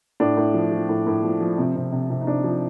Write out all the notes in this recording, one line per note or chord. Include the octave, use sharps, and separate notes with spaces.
A2 D4
A2
F3
F3
A2
A2
F3
F3
C3 C4
C3
C3
C3
D#4
C3 D4
F3